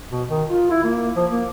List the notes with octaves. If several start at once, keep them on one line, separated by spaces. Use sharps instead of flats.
B2
D#3
F4
E4
A#3
F3
A#3